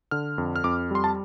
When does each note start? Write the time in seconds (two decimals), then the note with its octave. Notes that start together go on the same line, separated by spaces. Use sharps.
0.11 D3 F6
0.38 F2
0.56 F6
0.64 F2 D6
0.91 G3 C6
1.04 A5